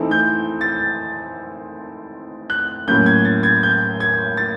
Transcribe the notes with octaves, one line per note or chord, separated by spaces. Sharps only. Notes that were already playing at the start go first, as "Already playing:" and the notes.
Already playing: E3 A3 C4 D#4
G6
A6
F#6
A2 F#3 A#3 C#4 G6
G#6
A6
G#6
G6
G#6
A6